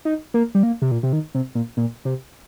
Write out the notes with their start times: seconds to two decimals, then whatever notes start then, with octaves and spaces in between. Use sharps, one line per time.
0.05 D#4
0.34 A#3
0.55 G3
0.63 A#3
0.82 C3
0.91 A#2
1.03 C3
1.13 D#3
1.35 C3
1.55 A#2
1.77 A#2
2.05 C3